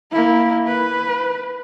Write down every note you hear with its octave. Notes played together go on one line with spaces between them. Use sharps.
A#3 E4
B4